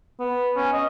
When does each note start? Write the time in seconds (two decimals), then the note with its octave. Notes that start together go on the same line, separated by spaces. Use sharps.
0.20 B3
0.56 C#4
0.73 D#5